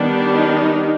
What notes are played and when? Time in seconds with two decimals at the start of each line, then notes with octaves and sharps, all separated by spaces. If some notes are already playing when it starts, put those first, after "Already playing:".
Already playing: D#3 G3 B3 D4
0.31 D#4